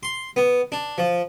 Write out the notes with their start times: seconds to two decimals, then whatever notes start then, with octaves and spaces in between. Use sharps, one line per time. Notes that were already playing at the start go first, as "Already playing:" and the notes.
0.03 C6
0.36 B3
0.72 D4
0.98 F3